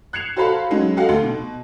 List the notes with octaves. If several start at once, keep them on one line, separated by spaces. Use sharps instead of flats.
F#6 G#6 C7 C#7 E7 F7
F#4 A4 C5 F5 A5 B5
F#3 G#3 C#4
F#4 G4 A4 D#5 F5 F#5
D2 A4 C6
B2